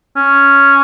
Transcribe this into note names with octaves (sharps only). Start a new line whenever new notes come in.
C#4